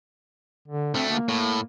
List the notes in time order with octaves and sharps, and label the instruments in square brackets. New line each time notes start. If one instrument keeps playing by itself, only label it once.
[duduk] D3
[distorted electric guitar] D2 A3 [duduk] C4
[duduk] A#3
[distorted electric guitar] A2